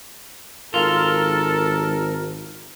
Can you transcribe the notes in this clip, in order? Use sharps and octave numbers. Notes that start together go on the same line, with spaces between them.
G#1 F4 A4 A#4